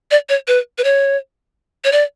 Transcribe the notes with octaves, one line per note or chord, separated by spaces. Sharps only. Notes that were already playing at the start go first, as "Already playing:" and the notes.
D5
C#5
B4
B4
C#5
C#5
D5